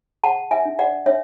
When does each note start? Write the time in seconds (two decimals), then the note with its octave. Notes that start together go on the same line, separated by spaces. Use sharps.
0.24 G#4 F#5 A5
0.51 E5 G#5
0.65 D4
0.79 D5 F#5
1.06 D4 C#5 E5